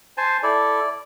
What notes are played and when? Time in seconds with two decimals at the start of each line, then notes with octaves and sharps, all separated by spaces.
0.17 C5 G#5 A5
0.43 E4 A4 D5